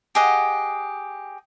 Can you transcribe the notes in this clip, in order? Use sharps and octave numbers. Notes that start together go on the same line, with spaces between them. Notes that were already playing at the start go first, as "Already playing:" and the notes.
G4 G#4 D#5 F#5